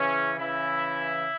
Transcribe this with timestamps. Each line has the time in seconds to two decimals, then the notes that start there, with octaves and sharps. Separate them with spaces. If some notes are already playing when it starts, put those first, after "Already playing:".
Already playing: C#3 E3 C#4
0.35 C#3 E3 E4